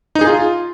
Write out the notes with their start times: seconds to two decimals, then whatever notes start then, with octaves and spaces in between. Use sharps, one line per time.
0.15 D#4
0.21 G#4
0.27 F4